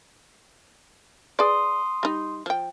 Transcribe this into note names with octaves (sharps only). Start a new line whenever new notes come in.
G#4 B4 D5 C6 D#6
G3 D#4
F3 G5